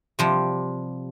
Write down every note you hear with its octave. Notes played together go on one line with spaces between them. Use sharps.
C3 F3 G3